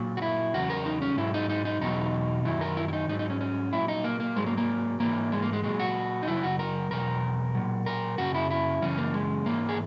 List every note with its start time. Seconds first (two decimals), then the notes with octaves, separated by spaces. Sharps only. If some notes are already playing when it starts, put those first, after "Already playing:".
Already playing: A#2 F#3
0.17 F#4
0.22 E4
0.54 E2 C#3 F#3 F#4
0.70 A#4
0.86 D#4
1.02 C#4
1.17 G#2 F#3 E4
1.34 D#4
1.49 D#4
1.65 D#4
1.81 E2 B2 F#3 D#4
2.45 F#2 D#3 F#3 E4
2.61 A#4
2.77 E4
2.88 E4
2.93 D#4
3.08 G#2 F#3 D#4
3.19 D#4
3.30 C#4
3.41 C#4
3.72 A#2 F#3 E4
3.88 D#4
4.04 A#3
4.20 A#3
4.36 G#2 F#3 G#3
4.47 A#3
4.57 A#3
5.00 G#2 E3 A#3
5.32 G#3
5.42 A#3
5.53 G#3
5.64 A#2 F#3 G#3
5.80 F#4
6.23 D#4
6.27 F#2 C#3 F#3 E4
6.43 F#4
6.59 A#4
6.91 E2 B2 F#3 A#4
7.55 A#2 F#3
7.86 A#4
8.18 F#2 C#3 F#3 F#4
8.35 E4
8.50 E4
8.82 F#2 C#3 E3 C#4
8.98 A#3
9.14 G#3
9.46 G#2 E3 A#3
9.69 G#4